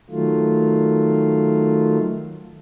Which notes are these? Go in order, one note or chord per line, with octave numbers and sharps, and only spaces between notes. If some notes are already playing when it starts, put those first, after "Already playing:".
D#3 F#3 A3 F4